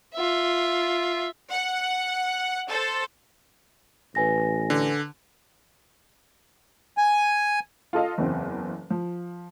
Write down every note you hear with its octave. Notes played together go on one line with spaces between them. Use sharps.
F4 E5
F#5
A4 C5
A1 B4 G#5 A#6
D3
G#5
F4 A4 D#5 F5
F#1 E2 C4
F3